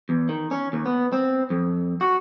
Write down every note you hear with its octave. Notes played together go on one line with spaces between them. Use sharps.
E2
D#3
C#4
D#2
B3
C4
F2
F#4